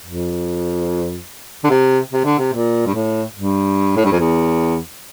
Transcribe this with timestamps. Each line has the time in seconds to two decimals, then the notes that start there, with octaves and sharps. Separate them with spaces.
0.05 F2
1.64 D3
1.70 C3
2.12 C3
2.24 D3
2.38 C3
2.53 A#2
2.86 G2
2.94 A2
3.35 G2
3.96 A2
4.05 G2
4.12 F2
4.19 E2